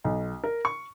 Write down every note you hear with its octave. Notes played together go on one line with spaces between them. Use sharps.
B1
A#4
C#6